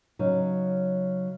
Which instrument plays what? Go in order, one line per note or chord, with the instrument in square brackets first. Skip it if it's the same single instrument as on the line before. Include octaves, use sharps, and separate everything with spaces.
[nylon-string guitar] C#3 F#3 D#4